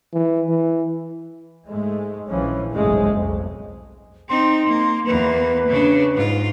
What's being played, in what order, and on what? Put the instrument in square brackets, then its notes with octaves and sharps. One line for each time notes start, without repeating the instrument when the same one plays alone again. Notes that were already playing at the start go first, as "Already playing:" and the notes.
[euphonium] E3
E3
[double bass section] G#2 G#3 A3
A#1 E3 F3 C#4
F#1 C2 G#2 C#3 G#3 A3
B1 F2
[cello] C4 D#4 [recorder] C6
[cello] A#3
[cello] E2 A#3 [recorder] B4
[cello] C#3 D4
G#2 F4